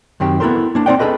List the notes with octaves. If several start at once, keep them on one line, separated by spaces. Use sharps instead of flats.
F#2 D#3 C4 G4
B3 E4 F#4 A4 A#4 C5
A#3 D4
C4 D4 D#4 D5 F#5 G5
G#4 A4 B4 D#5